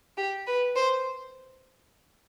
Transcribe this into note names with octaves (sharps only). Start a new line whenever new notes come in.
G4
B4
C5